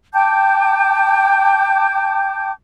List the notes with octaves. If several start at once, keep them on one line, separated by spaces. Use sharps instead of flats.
G5 A5 D6 G6